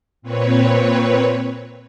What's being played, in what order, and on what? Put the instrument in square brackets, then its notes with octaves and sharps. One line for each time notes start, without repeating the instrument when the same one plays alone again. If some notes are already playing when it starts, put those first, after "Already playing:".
[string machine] A#2 C4 B4 C#5